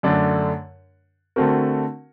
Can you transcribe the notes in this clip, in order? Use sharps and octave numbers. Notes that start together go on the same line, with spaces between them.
F#2 D3 A3 D4
D3 A3 C4 F#4 A#4